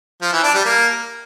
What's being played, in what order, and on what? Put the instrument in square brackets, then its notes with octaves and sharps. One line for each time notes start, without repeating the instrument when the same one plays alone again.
[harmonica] F3
E3
D4
G3
A#3